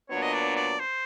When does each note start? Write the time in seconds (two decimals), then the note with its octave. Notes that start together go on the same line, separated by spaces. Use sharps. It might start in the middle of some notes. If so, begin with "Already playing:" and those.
0.10 A#2 F#3 B3 D4 C#5
0.22 D#5
0.33 D5
0.56 D5
0.80 C5